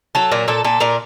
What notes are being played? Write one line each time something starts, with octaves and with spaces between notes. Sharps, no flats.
F#3 A4
A#2 A#4
A#2 A4
A#2 A4
A#2 A#4